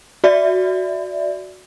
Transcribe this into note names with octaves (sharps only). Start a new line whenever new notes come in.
F#4 D5 E5